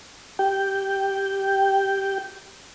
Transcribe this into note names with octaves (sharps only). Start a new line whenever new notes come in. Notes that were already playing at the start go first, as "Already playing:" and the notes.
G4 G5